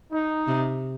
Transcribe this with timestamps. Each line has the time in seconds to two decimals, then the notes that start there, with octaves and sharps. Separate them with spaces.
0.12 D#4
0.47 C3